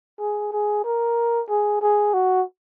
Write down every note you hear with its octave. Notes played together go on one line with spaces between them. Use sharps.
G#4
G#4
A#4
G#4
G#4
F#4